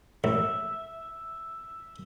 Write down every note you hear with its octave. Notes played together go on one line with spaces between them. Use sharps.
A1 E5